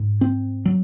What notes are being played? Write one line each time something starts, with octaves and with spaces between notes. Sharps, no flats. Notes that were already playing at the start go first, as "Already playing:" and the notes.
Already playing: G#2
C4
F#3